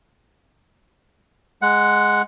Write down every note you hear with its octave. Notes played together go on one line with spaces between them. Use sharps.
G#3 F#5